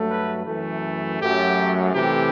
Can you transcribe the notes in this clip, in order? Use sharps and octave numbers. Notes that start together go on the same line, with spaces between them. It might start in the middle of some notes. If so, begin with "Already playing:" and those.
Already playing: G2 F#3 A3
B4
F#2 E3 A3
F#2 F#3 A3 G4
C3 E3 A3 G4